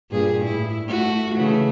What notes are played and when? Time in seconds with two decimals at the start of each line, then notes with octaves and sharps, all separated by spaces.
0.11 G2 A#2 G#4
0.45 A2 E4
0.85 A3 F#4
1.33 C#3 E3 A3